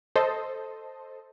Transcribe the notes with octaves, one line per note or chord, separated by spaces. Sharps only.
A4 C5 D#5